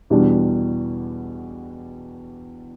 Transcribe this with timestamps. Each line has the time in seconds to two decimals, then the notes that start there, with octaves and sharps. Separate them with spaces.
0.10 E2 B2 G3 D4